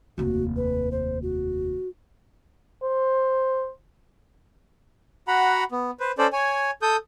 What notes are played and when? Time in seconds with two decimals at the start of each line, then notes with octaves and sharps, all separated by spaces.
0.18 F1 D#2 F#4
0.56 B4
0.91 C5
1.23 F#4
2.83 C5
5.28 F#4 F#5 A#5 B5
5.72 B3
6.00 B4 C5
6.18 C#4 A4 C5 D5
6.33 C#5 G#5
6.82 A4 D#6 G6